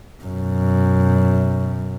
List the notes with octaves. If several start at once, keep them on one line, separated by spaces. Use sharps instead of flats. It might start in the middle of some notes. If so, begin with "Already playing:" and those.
F#2 B2